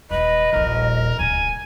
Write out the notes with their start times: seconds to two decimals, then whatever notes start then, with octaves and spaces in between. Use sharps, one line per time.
0.11 D#1 D#2 B4 D#5
0.53 D#1 A#1 A#4
1.19 D1 C#2 G#5